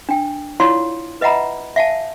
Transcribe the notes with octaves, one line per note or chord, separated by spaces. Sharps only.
D4 G5
E4 F4 C#5 D5 F5 C6
B4 D#5 E5 F#5 A#5 B5
E5 F5 G#5 A5